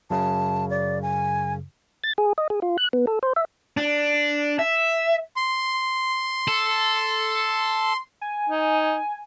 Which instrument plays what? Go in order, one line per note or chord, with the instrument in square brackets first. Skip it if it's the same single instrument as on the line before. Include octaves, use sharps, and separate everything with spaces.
[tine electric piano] F#2 C#3 [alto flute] A5
[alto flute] D5
G#5
[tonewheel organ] A6
G#4
D#5
G#4
F4
F#6
B3
A4
C5
E5
[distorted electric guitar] D4
E5
[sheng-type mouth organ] C6
[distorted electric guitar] A4
[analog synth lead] G#5
[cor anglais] D#4